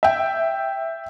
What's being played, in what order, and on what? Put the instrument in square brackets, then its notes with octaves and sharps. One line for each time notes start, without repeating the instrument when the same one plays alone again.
[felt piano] E5 G5